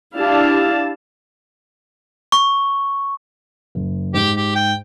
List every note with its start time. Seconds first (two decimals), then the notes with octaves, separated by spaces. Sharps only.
0.17 D4 E4 G4 F5 A5
2.32 C#6
3.75 F#1
4.14 G#2 G4
4.37 G4
4.55 G5